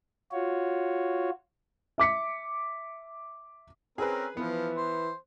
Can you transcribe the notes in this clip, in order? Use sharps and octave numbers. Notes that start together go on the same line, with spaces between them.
F4 F#4 C#5
E5 D6 B6 C#7
C4 C#4 G#4 A#4 B4
E3 F3 B3
C5